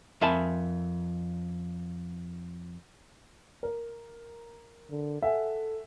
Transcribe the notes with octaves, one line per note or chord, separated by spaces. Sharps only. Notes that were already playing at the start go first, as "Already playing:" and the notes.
F2 A#4 E5 G#5 A5 B5
A#4
D3
A4 E5 F#5 G#5